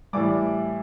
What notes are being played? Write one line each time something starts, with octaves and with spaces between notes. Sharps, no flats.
A2 E3 G3 D5 D6